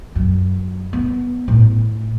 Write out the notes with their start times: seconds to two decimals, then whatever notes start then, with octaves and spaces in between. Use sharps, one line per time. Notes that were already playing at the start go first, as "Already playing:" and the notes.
0.15 F#2
0.93 B3
1.48 A2